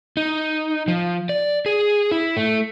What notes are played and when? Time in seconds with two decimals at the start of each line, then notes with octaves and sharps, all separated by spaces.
0.17 D#4
0.88 F3
1.29 D5
1.66 G#4
2.11 E4
2.36 A3